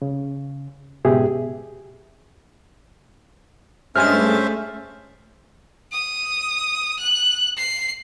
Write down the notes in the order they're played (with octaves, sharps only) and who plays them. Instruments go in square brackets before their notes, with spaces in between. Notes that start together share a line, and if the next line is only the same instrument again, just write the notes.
[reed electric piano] C#3
C#2 G#2 B2 G4 G#4 E5
[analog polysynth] G2 G#3 A6 [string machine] A3 [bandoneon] C#4 C5 E5 [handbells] F6
[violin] D#6
F#6
C7